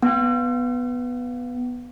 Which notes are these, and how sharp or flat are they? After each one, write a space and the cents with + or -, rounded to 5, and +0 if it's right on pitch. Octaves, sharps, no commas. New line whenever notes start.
B3 +0 F#5 +45